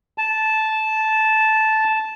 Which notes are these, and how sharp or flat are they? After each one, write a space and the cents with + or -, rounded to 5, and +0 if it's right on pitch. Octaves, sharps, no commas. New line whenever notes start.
A5 -10